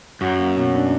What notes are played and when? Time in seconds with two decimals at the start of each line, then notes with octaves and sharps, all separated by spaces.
0.21 F#2 F#4
0.39 A#3
0.57 B2
0.75 D4